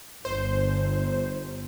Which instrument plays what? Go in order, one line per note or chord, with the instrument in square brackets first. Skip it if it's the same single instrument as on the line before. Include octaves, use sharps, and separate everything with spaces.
[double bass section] G1 [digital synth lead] C5